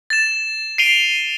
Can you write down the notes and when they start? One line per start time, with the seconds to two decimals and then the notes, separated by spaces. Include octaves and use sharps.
0.10 A6 E7
0.78 C7 D7 D#7 F7 G7